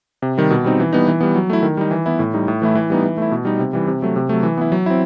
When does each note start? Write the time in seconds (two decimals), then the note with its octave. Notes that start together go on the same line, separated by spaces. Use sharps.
0.22 C3
0.38 D#3 G3
0.50 B2
0.64 G3 C4 D#4
0.80 E3
0.93 G3 B3 D#4
1.08 E3
1.21 G3 B3
1.35 F#3
1.50 A3 E4
1.63 D#3
1.77 G3 D#4
1.91 E3
2.06 B3 E4
2.19 A2
2.34 G3 D#4
2.48 A2
2.62 E3 A3 E4
2.75 E3
2.90 G3 B3 D#4
3.04 E3
3.17 A3 E4
3.31 B2
3.45 G3 D#4
3.59 C3
3.73 E3 G3
3.87 C3
4.02 F#3 A3
4.16 C3
4.29 F#3 A3
4.43 E3
4.57 B3 E4
4.72 F#3
4.86 C4 E4